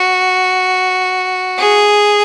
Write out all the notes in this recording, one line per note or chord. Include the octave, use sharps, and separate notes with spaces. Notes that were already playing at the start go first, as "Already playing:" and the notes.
Already playing: F#4
G#4